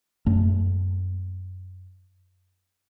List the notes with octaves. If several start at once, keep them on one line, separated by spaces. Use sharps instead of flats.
F#2 A3